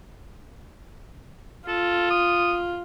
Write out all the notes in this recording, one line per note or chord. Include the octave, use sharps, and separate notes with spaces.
F4 A4
D#6